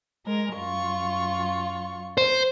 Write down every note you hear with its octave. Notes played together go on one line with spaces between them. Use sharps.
G#3 A#4
F#2 F4 C#6
C5